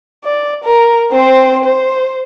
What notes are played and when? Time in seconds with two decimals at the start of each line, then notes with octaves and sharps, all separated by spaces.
0.24 D5
0.64 A#4
1.12 C4 C5
1.64 C5